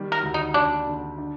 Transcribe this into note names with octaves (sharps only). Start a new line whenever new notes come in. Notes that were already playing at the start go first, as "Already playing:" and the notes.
Already playing: D#3 G3
A#4
D2
D#4
D2 D4
D3
D4